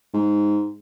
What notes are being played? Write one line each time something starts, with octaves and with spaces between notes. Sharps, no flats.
G#2